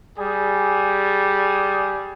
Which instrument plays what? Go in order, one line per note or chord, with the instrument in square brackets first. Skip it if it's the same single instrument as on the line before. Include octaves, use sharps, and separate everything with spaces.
[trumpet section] G3 G#4